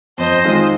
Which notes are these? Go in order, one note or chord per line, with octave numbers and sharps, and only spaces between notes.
F2 C5 D#5
D#3 G#3 C4 F4